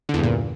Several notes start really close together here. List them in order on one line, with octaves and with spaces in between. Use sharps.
D3 E2 G2 A#2